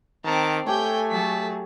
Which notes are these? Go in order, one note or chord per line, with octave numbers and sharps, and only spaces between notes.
D#3 C4 A5 A#5 D6
A3 G4 A4 C#5 G5 G#5 G6
F#3 G#4 A5 B6